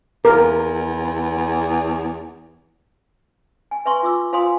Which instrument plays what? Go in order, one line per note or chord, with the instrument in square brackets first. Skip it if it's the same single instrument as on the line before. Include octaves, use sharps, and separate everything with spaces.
[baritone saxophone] E2 [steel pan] A#4
[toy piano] G#5
B4 E5 G#5 C6 C#6
F4 D6 E6
F4 C5 F5 G#5 C6 D#6